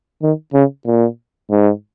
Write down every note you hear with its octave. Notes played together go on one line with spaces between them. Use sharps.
D#3
C#3
A#2
G#2